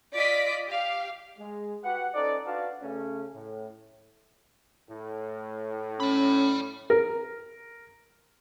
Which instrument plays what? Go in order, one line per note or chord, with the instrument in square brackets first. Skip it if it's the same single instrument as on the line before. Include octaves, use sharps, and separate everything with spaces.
[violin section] F4 D5 D#5 B6 D7
G4 F5
[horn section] G#3
F#4 G4 B4 F#5
C#4 D#4 A4 C5 D5
D4 F#4 B4 D5 F5 A5
C#3 A3 C#4
A2
[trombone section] A2
[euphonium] C#4 [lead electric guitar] D5 B5
[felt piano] A#4